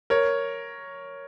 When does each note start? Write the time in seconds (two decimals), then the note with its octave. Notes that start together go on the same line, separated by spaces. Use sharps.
0.10 A#4 C#5